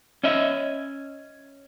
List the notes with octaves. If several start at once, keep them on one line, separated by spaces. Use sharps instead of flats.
C#4 D#5 E5